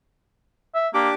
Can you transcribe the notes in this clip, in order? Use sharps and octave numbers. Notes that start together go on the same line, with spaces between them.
E5
A#3 D4 G4 D6